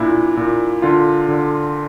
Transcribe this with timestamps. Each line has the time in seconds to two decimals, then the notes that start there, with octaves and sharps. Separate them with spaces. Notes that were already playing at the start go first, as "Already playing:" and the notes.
Already playing: A#2 A#3 D4 E4
0.37 A#2
0.82 D3 F4
1.28 D3